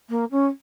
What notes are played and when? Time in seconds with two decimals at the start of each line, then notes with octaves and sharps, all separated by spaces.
0.09 A#3
0.31 C#4